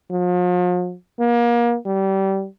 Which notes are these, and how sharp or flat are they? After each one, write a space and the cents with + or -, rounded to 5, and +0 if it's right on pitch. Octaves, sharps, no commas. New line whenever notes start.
F3 +40
A#3 +30
G3 -25